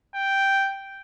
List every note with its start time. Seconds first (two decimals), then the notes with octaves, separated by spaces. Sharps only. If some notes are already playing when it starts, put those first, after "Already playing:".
0.15 G5